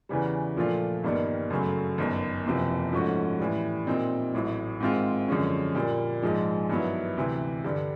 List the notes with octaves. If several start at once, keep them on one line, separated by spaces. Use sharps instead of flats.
E2 C#3 E3 G3
A#2 F3 A3 D4 F4
G1 G2 D#3 G3 A#3
F#2 C#3 F#3 A3
G1 F#2 D#3
F#1 E2 C3 F3
G#2 F3 A3 C#4 F#4
A2 E3 G3
A#2 G3 C4 D#4
A1 A2 F#3
G#2 D#3 G#3 C4 F4
F#2 D3 F3 G#3 C#4
A#2 G3 A#3
A#1 G#2 F3 G#3
G2 D#3 F#3 B3 E4
D2 C3 E3
G2 D3 G3